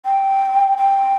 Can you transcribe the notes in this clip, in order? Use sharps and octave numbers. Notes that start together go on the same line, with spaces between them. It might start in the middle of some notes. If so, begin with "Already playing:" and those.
G5
G5